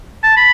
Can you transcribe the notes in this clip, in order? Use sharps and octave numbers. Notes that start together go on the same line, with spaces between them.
A5
B5